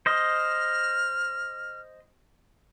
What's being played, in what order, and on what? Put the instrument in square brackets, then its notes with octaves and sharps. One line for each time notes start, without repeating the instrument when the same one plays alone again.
[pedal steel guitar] C5 D#5 [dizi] F6